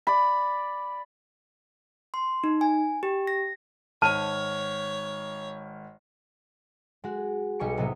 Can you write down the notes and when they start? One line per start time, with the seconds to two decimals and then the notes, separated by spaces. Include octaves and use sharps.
0.07 D5 B5
2.14 C6
2.44 D#4
2.61 G#5
3.03 G4
3.27 A#6
4.02 G#1 C#5 A5 F6
7.04 G#3 F#4
7.59 B1 G3 G#5 C#6 C#7
7.77 A2 C3 F#3 B3 D#4 E4